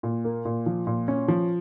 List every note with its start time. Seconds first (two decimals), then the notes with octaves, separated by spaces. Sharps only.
0.03 A#2
0.25 A#3
0.45 A#2
0.66 F3
0.87 A#2
1.08 C#4
1.28 F3